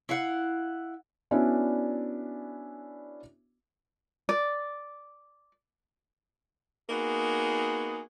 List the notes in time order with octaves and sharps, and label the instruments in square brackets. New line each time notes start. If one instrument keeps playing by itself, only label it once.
[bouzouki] E4 F5 F#5
[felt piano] B3 C#4 D4 E4 F#4 D5
[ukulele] D5
[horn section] A#3 B3 D#4 F#4 G#4